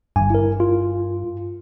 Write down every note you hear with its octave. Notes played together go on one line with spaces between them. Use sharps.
G1 G2 G#5
E4 A#4
F4